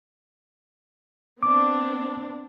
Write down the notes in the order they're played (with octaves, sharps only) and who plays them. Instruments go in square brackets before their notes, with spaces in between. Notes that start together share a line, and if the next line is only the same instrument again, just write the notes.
[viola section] B3 C4 D4 [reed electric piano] D6